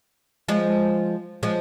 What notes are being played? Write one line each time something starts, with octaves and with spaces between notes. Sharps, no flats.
F3 G#3
F3 G#3